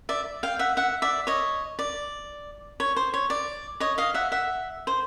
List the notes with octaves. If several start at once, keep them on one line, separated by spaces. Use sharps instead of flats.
D5 E5
F5 G5
E5 F#5
E5 F#5
D5 E5
C#5 D#5
D5
C#5
C5
C#5
D5
C#5 D#5
D#5 F5
E5 F#5
E5 F#5
C5